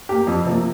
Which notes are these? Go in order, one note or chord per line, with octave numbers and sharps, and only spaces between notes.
A#3 G4
F2
C3 F3 A#3